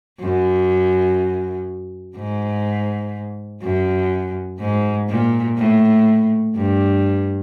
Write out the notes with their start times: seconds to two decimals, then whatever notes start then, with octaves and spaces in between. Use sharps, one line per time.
0.20 F#2
2.16 G#2
3.62 F#2
4.59 G#2
5.09 A#2
5.57 A2
6.56 G2